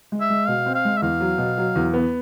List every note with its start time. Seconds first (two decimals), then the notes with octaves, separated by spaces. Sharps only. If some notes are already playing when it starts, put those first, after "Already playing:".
0.12 G#3
0.21 E5
0.30 G#3
0.47 B2 F5
0.66 C4
0.75 F5
0.85 G#3
0.97 E5
1.02 E2 F5
1.20 F#3
1.38 B2
1.58 F#3
1.75 E2
1.94 B3